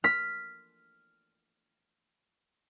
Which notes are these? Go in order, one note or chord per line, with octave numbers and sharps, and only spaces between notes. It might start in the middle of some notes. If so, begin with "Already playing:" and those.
F6 B6